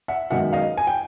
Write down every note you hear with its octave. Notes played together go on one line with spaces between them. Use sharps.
E5 F#5
F#2 D#3 G#3 B3 E5 F#5
D#5 F5
G#5
G5